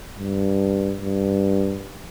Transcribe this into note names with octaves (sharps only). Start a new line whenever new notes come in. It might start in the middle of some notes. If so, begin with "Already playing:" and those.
G2
G2